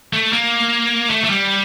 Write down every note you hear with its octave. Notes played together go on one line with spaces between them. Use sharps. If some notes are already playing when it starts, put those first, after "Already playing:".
A3
A#3
A3
A3
G3